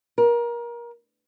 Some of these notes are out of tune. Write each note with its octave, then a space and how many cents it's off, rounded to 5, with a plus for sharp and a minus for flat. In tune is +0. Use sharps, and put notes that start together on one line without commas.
A#4 +25